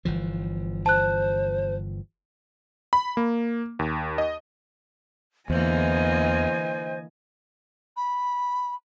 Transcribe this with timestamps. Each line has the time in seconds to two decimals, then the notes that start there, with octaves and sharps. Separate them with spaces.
0.05 G1 E3 F3
0.86 C5 A5 F#6
2.93 B5
3.17 A#3
3.79 D#2
4.18 D#5
5.50 E2 D3 E3 A#3 C5 D#5 G#5
7.96 B5